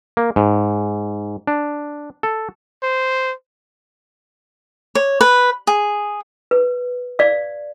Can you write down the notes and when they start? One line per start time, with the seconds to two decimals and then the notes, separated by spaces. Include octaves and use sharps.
0.17 A#3
0.36 G#2
1.47 D4
2.23 A4
2.83 C5
4.95 C#5
5.21 B4
5.67 G#4
6.51 B4
7.19 D5 F5